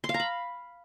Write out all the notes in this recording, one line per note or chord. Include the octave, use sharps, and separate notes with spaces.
C6
F5
A#5
B5